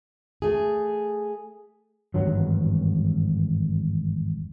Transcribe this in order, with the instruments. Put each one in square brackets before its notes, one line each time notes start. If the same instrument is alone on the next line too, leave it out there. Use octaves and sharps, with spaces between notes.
[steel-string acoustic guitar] A3 G#4
[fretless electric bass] G#1 E2 G2 F#3